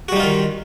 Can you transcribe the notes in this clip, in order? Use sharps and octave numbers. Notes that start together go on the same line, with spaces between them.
D#3 G3 D#4 F4 F#4